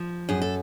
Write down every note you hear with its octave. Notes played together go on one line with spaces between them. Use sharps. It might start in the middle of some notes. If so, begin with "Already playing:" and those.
Already playing: F3
F#2 G#4
A4